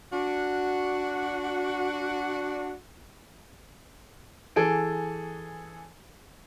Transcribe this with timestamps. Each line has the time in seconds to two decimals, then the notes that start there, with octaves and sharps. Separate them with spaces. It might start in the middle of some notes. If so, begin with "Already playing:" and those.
0.13 D4 F#4
4.56 E3 G#4 A4 D7